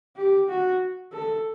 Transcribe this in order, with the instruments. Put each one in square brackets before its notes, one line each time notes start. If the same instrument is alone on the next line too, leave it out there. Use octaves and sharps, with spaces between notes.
[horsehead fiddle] G4
F#4
A4